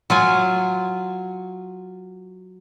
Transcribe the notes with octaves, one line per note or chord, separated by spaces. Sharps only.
F#3 F4 G#5